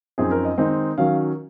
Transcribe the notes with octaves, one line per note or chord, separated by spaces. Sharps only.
F#2 F3 C4 D#4 G#4
A#4
D#5
D#3 G#3 C4 D#4
D#3 F#3 C#4 F5